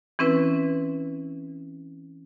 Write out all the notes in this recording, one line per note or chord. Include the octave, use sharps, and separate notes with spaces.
E3 C4 C#4 E4 B4